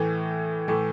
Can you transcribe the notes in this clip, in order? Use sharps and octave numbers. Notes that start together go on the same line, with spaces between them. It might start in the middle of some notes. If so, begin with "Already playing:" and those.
Already playing: A2 E3 A3
A2 E3 A3